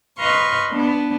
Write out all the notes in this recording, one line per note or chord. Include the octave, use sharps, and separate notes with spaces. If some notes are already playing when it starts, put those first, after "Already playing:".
B4 D#5 F5 C6 C#6
B3 D4